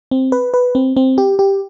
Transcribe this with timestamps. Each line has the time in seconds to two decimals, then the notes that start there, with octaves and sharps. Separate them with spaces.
0.11 C4
0.32 B4
0.54 B4
0.75 C4
0.97 C4
1.18 G4
1.39 G4